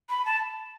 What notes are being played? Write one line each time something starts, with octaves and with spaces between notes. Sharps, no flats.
B5
A5